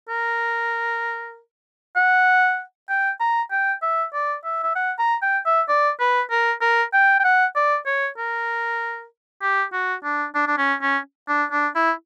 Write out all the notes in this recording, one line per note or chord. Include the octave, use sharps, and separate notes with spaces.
A#4
F#5
G5
A#5
G5
E5
D5
E5
E5
F#5
A#5
G5
E5
D5
B4
A#4
A#4
G5
G5
F#5
D5
C#5
A#4
G4
F#4
D4
D4
D4
C#4
C#4
D4
D4
E4